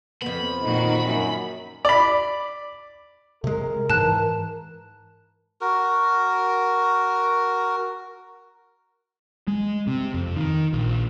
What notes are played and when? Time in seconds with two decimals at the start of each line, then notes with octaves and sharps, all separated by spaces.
0.22 F2 B3 B5
0.62 A#2 D#3 D#4 F#4
1.06 F#2
1.85 D5 B5
3.44 C3 G#3 A#4
3.90 G#2 E3 A5 F#6
5.61 F#4 A#4
9.48 G#3
9.87 C3
10.14 F2
10.36 D#3
10.73 A#1